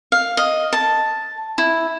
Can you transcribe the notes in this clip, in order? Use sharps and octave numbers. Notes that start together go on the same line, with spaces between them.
F5
D#5
A5
E4